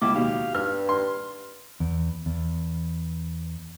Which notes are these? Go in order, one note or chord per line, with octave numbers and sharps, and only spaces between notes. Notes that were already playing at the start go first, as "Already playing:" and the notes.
C#2 E4 D6
D#2 B2 G4 F5
G2 F6
C6
E2
E2